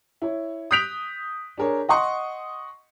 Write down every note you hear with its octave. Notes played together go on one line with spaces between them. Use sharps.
E4 C#5
D#6 F#6 G6 B6 D7 F7
D4 G#4 A#4 C#5
D#5 F#5 C6 C#6 D#6